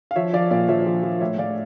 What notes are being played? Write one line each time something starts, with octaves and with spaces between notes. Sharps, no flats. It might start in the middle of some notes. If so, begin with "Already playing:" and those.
F5
F3 C#5 E5
F3 D5 F5
A#2 D5 F5
F3 C#5 E5
F3
F3
A2 C#5 E5
A2 D5 F5